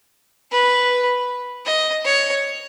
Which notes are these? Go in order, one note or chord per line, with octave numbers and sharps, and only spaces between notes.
B4
D#5
C#5